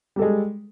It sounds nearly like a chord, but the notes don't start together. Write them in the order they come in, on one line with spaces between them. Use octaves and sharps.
G3 A4 G#3